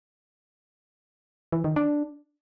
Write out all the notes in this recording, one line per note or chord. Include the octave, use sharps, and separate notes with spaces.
E3
D#3
D4